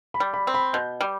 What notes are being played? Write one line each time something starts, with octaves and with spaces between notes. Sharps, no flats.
B5
G3
B5
C4
B5
B2 G6
G3